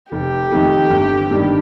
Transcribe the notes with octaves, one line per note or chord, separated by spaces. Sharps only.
F1 G4
F2 D#3 A3 D#4
G1
G2 D#3 G3 D4